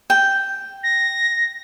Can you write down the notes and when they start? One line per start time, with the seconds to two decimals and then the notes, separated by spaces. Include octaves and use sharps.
0.10 G5
0.83 A#6